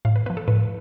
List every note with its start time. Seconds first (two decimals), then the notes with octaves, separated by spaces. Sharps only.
0.05 A2 F5
0.16 B4
0.26 F3 B3 B4
0.37 A4
0.48 A2 B4